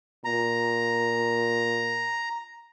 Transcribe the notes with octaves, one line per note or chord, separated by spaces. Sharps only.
A#2 A#5